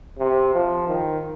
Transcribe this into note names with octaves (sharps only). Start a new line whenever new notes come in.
C3
F3
D#3